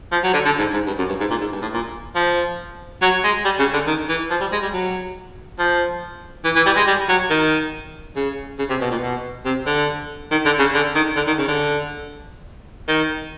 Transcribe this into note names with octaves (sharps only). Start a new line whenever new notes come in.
F3
F#3
D3
D3
G#2
G#2
G2
F#2
G2
G#2
A#2
G#2
G2
A2
A#2
F3
F#3
G#3
G3
C#3
D3
D#3
E3
F3
G3
G#3
G3
F#3
F3
E3
E3
G3
G#3
G3
F#3
D#3
C#3
C#3
C3
B2
A#2
B2
C3
D3
D#3
D3
C#3
D3
D#3
D3
D#3
C#3
D3
D#3